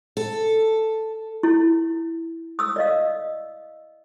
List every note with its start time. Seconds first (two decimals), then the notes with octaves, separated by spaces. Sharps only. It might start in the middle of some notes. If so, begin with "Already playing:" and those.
0.17 A4
1.43 E4
2.59 D#6 E6
2.76 D5 D#5 F5